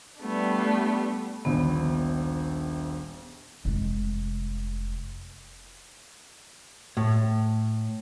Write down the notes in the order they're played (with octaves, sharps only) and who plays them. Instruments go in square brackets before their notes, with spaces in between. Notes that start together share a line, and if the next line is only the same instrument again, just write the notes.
[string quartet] G3 A3 B3 D4
[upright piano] D#1 A#1 [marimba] B3
[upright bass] F1 G#3
[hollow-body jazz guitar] A2